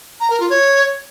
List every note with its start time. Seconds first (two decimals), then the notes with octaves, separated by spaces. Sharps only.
0.20 A#5
0.30 A#4
0.40 F4
0.50 C#5